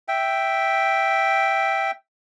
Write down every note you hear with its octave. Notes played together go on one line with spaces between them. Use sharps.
E5 G5